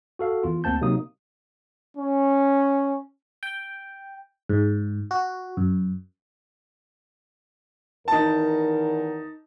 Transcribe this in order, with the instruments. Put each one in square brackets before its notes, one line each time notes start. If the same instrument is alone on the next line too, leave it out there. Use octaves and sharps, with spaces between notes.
[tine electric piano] F#4 A4 F5
E2 F4
D2 A#3 C4 A5 G6
C3 F#3 A#3 D#4 D#6
[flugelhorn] C#4
[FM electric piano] G5
G#2
F#4
F#2
[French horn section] E2 D#3 A#4 [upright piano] D#4 A5